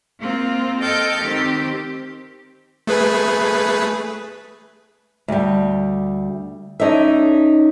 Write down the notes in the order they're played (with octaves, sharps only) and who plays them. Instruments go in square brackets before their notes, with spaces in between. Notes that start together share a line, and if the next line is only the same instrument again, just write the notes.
[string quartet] A#3 C4 F4
A4 D#5 G5 F6 G6 A6
D#3 C4 G4
[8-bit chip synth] A3 G#4 B4
[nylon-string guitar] D2 G3
C#4 D#4 A4 D5 E5